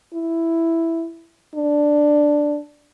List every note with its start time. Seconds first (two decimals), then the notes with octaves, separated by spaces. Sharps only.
0.15 E4
1.55 D4